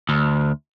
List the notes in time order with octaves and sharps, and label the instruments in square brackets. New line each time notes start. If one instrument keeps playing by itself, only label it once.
[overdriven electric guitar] D2